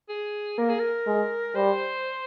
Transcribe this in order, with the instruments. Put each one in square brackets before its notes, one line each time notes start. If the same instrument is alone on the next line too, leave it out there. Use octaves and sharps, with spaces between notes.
[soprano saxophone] G#4
[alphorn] A#3 [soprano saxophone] A#4
[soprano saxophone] G#4
A#4
[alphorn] G#3
[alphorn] G3 [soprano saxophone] C5